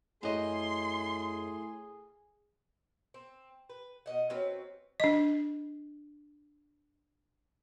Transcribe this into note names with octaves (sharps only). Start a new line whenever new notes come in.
F#2 A2 G#4 D#5 C6
C4
B4
B2 D#5 F#5
F#3 C4 C#4 B4
D4 D#5